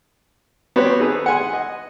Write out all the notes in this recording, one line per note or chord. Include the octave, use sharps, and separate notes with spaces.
B3 C4 F#4 G4 B4 C#5
D#4 G#4 A4 B4
F#5 G#5 C6
D#5